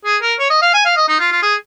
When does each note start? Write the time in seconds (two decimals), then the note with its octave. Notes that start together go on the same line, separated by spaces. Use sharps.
0.05 G#4
0.22 A#4
0.39 C#5
0.50 D#5
0.62 F5
0.74 G#5
0.85 F5
0.97 D#5
1.08 D#4
1.20 F4
1.32 F4
1.43 G#4